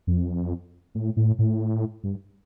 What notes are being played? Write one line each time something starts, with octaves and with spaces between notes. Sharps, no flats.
F2
A2
A2
A2
G2